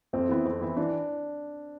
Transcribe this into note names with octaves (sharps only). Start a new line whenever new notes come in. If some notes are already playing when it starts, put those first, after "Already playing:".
F2 C4
E3 B3 E4
F2
E3 B3 E4
E3 D4